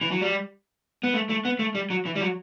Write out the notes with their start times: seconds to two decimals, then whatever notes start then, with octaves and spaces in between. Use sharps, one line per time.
0.01 E3
0.12 F#3
0.21 G3
1.03 B3
1.14 A3
1.30 A3
1.45 B3
1.59 A3
1.75 G3
1.90 F#3
2.06 E3
2.16 G3
2.21 F#3